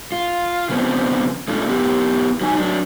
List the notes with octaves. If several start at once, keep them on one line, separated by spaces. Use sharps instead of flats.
F4
C#3 F3 B3 C4 D4
A3 C#4 D4 E4 F4
B3 E4 G4
F#3 D#4 G#5
F#3 D4